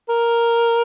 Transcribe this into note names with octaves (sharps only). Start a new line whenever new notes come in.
A#4